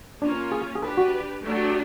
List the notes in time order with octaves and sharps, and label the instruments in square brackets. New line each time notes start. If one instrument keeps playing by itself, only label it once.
[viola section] A#3 C#4 F4 [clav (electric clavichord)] D4
[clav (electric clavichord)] G#4
G#4
[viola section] D4 G4 B4 [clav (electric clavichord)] A4
[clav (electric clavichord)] F#4
[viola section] F#3 A3 D4 G4